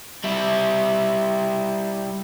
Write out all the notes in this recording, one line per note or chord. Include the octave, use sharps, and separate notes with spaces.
G3 E4